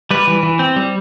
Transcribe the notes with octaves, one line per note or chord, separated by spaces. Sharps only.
G3 B4
E3
E3
C4
G3